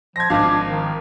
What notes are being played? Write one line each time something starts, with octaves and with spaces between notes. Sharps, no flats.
F3 G#6 A#6
G#1 F3 D4 F5
D#3